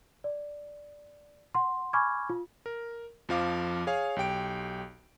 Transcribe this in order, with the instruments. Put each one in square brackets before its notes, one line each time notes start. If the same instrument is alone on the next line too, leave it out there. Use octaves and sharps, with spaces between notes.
[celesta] D5
F#5 C6
G#5 B5 C#6 D6 F6 G#6
F4
[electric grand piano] A#4
F2 F3 F5 D6
G#4 C#5 F5 G#5
B1 G4 G5 D7